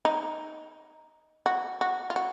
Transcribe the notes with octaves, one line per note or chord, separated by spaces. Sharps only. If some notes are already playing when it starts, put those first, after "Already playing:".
D#4
F#4
F#4
F4
F#4